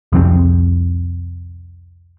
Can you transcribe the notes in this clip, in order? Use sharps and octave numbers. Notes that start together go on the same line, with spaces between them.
C2 F2 F#3 C4